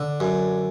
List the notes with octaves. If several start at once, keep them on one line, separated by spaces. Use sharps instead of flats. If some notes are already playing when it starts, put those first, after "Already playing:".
Already playing: D3
F#2